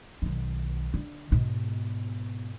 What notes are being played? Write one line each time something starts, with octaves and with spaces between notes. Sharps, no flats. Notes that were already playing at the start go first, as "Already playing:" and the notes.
B1 D#3
D3
G#2 B2